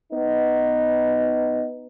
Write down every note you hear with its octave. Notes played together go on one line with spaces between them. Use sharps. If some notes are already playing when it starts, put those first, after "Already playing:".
B3 D#4